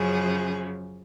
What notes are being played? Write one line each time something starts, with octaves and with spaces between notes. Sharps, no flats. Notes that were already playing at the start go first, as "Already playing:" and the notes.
Already playing: F#2 C#3 F3 G#4